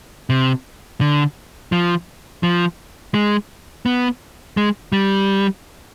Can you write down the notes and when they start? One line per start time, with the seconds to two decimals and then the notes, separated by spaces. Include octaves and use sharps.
0.30 C3
1.01 D3
1.72 F3
2.43 F3
3.14 G#3
3.86 B3
4.57 G#3
4.92 G3